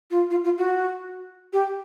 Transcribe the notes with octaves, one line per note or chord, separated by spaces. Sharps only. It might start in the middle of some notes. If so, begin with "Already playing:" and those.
F4
F4
F4
F#4
G4